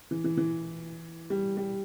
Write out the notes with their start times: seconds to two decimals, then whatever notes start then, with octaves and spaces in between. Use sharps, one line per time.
0.11 E3
0.24 E3
0.37 E3
1.30 G3
1.57 G3